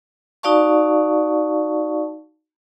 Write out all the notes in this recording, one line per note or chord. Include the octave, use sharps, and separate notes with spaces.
D#4 F#4 D5 F5 A5 C#6